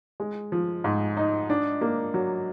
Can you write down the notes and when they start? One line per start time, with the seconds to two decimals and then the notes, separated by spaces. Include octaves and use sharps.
0.20 G#3
0.52 F3
0.84 G#2
1.17 D#4
1.50 D4
1.81 A#3
2.14 F#3